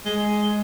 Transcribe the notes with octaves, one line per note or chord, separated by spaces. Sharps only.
G#3